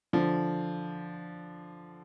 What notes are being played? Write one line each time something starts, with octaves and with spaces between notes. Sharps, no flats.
D3 F3